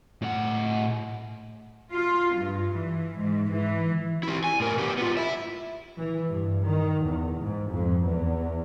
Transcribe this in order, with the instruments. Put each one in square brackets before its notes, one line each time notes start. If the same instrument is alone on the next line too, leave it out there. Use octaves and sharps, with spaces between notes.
[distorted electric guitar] A2 F#5
[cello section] F4
G2
E3
G#2
E3
[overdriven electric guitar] E4 G4
G#5
A2 A#4
B3 G4
B3 F4
E4 E5
[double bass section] E3
G2
D#3
E2
G#2
F2
E2